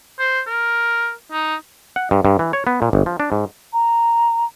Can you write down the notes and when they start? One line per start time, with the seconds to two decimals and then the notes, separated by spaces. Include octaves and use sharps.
0.19 C5
0.47 A#4
1.32 D#4
1.96 F#5
2.11 G2
2.25 G2
2.39 E3
2.53 C#5
2.67 B3
2.82 A#2
2.93 G1
3.06 F3
3.20 D4
3.32 G#2
3.73 A#5